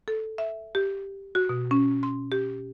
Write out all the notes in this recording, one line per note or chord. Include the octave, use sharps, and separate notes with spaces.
A4
E5
G4
F#4
B2
C#4
C6
G4